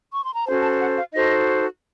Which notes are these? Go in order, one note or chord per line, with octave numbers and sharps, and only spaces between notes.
C#6
C6
A#5
C#4 F#4 A4 C5 A5
A5
F#5
F5
D#4 F#4 A4 C5 D#5